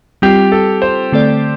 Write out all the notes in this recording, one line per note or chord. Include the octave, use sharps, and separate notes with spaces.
G3 C4 F4 G4
A4
C5
D3 A3 C4 A4 D5